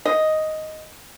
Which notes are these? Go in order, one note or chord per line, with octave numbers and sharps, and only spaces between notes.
D#5